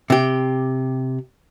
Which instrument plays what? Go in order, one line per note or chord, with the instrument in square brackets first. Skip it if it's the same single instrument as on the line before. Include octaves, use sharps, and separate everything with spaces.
[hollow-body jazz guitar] C3 G4